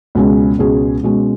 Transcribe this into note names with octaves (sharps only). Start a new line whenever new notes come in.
C#2 B2 G#3 C#4 G#4
C#2 B2 G#3 C#4 G#4
B2 G#3 C#4